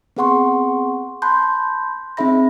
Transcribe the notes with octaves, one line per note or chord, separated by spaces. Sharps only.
B3 C4 G#4 F#5 C6 C#6
A5 B5 C6 F#6 G6
C4 D#4 G#4 E5 B5 A#6